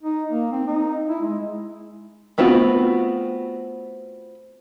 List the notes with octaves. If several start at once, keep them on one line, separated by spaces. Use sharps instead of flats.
D#4
A#3
C4
D#4
E4
G#3
A3 B3 C4 F4 F#4